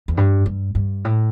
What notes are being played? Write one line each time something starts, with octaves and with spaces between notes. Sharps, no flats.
E2
G2
G2
G2
A2